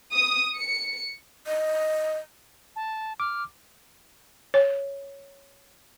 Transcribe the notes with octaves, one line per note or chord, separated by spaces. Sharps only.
D#6
C#7
D#5
A5
D6 F6
C#5